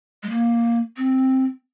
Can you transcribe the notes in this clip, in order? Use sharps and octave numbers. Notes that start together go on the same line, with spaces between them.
G#3
A#3
C4